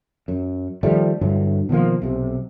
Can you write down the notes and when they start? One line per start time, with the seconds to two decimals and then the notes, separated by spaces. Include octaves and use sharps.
0.28 F#2
0.83 D#3 F3 G3 A3
1.21 G2 D3 E3 F#3
1.69 B2 D#3 F3 A#3
2.02 B1 C3